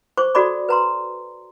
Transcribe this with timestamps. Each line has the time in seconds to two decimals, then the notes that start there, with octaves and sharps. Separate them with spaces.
0.17 C5 C#6 D6
0.35 F#4 A4 D5 B5 D6
0.69 B4 A#5 C6